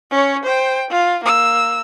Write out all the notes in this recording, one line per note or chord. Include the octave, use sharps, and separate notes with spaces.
C#4 C#5
C5 G5
F4
A#3 E6